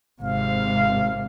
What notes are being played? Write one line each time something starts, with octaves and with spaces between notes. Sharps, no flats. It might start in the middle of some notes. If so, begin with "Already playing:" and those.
G#1 C3 F5